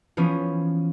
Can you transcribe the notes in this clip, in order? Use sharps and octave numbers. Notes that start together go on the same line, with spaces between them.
E3 F3 B3 C#4